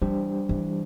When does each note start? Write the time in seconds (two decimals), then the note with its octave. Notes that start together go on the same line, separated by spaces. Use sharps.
0.02 E3 G3 D4 G4 C5
0.49 E3